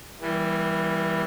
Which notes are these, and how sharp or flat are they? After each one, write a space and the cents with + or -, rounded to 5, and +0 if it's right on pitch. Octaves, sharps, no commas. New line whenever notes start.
E3 +0 G3 +0 A#3 +45